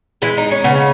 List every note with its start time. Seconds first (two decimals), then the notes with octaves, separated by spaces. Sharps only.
0.22 E3 G#3 E4
0.38 D#4
0.51 C#4
0.64 C#3 B3